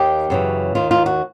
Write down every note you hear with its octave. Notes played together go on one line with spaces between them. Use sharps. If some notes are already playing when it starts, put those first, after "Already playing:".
Already playing: D#2 D#3 G4
F#2 C#3 E3
D#2 D#3 F4
F4
F#4